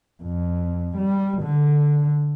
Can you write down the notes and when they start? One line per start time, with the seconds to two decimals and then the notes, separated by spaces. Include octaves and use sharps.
0.23 F2
0.97 G3
1.43 D3